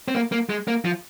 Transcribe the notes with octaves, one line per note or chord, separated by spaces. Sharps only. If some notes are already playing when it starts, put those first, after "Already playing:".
C4
A#3
A#3
G#3
A#3
F3